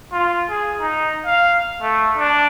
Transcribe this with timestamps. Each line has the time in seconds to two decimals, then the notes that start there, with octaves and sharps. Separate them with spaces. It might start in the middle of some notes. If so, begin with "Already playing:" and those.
0.13 F4
0.50 G#4
0.80 D#4
1.26 F5
1.82 A3
2.17 D4